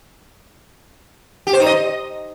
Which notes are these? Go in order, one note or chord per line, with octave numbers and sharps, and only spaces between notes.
G4
C5
D#4
D#5